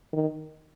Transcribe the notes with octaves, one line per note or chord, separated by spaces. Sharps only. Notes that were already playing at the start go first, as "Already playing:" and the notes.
D#3